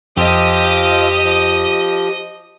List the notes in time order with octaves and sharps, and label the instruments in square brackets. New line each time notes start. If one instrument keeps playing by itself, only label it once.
[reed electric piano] F2 [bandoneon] F3 F4 E6 [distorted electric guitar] G4 G5 [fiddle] D#5 D#6
[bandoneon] F3